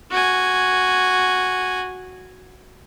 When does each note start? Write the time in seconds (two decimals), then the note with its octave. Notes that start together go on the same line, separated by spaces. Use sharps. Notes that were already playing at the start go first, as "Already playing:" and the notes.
0.11 F#4 G#5